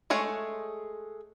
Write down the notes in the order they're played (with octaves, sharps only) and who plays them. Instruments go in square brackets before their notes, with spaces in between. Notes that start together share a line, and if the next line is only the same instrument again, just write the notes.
[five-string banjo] G#3 A3 G#4 C#5